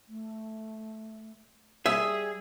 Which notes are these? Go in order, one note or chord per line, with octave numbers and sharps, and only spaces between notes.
A3
G3 G#4 E5